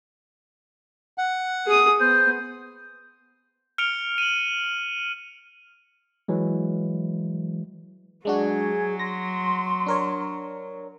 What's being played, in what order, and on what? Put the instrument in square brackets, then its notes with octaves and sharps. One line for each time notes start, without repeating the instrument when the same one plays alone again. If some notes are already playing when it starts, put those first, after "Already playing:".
[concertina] F#5
[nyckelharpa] G#4 D#6
[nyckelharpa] B3 [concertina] C5
[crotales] F6 C#7 D7 F7 G7
D#7 F#7
[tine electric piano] E3 F#3 G#3
[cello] F#3 [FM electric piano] G#3 D4 F#4 [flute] G#4
[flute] C6 [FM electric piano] A#6
[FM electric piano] D4 A#4 C#5